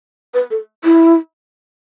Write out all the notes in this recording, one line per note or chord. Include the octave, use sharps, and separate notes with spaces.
B4
A4
E4